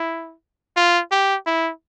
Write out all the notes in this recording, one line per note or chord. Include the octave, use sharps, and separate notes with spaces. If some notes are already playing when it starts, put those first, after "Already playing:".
Already playing: E4
F4
G4
E4